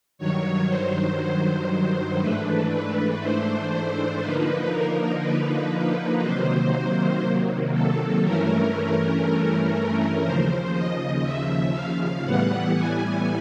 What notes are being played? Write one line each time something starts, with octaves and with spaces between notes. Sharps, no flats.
G2 D#3 F#3 C#5
C5
C5
G#2 E3 A3 D4 B4
B4
C5
C5
D3 F3 A#3 D#4 B4
A#4
B4
C3 D#3 F#3 A#3 C5
A4
G2 E3 A3 C#4 A#4
D#2 C#3 F3 C5
D#5
E5
F5
A2 E3 G3 B3 F#5
G#5